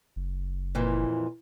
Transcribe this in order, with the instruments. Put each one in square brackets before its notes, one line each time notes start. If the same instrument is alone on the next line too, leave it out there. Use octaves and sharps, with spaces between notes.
[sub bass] F#1
[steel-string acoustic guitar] F2 A#2 E3